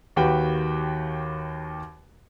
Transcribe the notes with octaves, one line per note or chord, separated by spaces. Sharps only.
D#2 D#3 F#4 G4 B4 G5